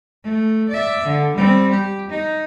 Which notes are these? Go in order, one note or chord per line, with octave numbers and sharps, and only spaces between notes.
A3
D5 E5
D3
G3 C4
G4
D#4